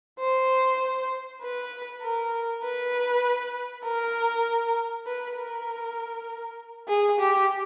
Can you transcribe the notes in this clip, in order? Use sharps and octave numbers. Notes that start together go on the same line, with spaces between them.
C5
B4
A#4
B4
A#4
B4
A#4
G#4
G4